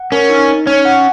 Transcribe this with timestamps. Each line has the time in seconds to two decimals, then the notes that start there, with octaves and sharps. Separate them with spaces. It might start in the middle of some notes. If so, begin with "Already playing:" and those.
Already playing: F#5
0.12 C#4 A#4
0.30 D#4
0.48 D#4
0.66 C#4 C#5
0.85 F#5